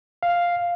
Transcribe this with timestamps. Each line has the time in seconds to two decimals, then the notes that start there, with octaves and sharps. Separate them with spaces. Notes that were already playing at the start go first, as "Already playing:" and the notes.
0.23 F5